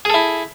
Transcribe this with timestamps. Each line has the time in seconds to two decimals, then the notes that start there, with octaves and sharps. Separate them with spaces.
0.05 G#4
0.10 A4
0.14 E4